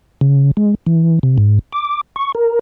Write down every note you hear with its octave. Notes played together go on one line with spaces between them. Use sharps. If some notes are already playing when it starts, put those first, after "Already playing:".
C#3
G#3
E3
C3
G#2
D6
C#6
A#4